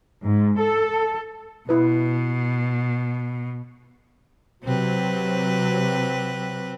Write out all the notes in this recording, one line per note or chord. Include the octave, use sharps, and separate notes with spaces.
G#2
A4
B2 E4 B4
C3 F#3 C4 B4